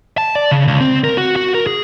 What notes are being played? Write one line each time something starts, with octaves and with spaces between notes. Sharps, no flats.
A5
D5
C#3
C#2
C4
A#4
F#4
F#4
A#4
G#4